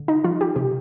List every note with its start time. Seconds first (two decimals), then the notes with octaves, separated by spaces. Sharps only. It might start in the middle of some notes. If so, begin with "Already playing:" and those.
Already playing: D3
0.08 D#4
0.24 F3 F4
0.41 G4
0.56 C3 G4